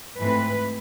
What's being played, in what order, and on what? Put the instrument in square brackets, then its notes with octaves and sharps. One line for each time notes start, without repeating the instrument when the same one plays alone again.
[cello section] G#2 E3 A3 C4 B4